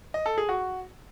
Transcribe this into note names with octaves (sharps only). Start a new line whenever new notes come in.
D#5
A4
G#4
F#4